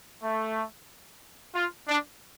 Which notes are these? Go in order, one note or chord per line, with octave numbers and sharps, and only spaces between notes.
A3
F4
D4